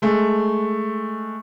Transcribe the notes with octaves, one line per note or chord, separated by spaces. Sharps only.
G#3 A3